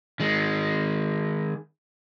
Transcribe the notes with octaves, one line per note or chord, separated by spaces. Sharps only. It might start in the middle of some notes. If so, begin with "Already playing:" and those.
D#3 G#3